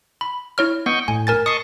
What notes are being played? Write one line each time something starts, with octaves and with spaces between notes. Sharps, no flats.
B5
E4 C#5 F6
B3 D#5 G5 C#6
A2 G#5
A#4 G#5 A6
D#5 A5 C#6 D#6 C7